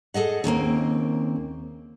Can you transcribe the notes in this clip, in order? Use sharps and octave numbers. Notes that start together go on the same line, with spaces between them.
G#4 A4 D#5 F#5
D#2 C#3 A#3 C4